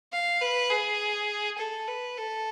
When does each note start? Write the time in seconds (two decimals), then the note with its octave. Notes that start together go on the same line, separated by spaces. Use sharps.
0.13 F5
0.41 B4
0.70 G#4
1.58 A4
1.87 B4
2.17 A4